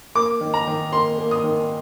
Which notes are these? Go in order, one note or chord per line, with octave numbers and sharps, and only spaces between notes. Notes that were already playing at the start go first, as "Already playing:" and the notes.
A#3 D6
D#3
A#5
D#3
A#3 C6
A#3
D#6
D#3